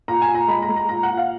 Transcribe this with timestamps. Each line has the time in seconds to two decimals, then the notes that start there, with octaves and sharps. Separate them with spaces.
0.08 A#2 A#5
0.22 G#5
0.28 A#2
0.35 A#5
0.48 G#3 B5
0.62 A#5
0.69 G#3
0.76 A#5
0.89 A#2 A#5
1.03 F#5
1.11 A#2
1.17 F5